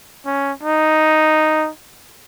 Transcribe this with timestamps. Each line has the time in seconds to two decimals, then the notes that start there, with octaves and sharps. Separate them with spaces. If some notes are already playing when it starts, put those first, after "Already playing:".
0.26 C#4
0.63 D#4